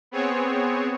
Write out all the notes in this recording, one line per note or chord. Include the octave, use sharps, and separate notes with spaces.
B3 C4 G#4 C#5